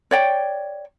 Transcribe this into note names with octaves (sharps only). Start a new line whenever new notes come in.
C#5 D5 G5